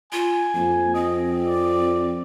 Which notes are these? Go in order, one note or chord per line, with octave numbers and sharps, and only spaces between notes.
F4 G#5
F2 A#3
C4 D#5
D5